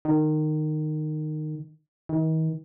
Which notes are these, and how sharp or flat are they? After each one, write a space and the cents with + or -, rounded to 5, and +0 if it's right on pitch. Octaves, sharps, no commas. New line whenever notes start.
D#3 -20
D#3 +40